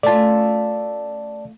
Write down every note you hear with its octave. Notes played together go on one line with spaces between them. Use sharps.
A3 C#4 F4 D5 A5